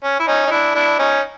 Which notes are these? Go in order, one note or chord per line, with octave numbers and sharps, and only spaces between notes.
C#4
E4
C#4 D#4
D#4
D4 E4
D4 E4
C#4 D#4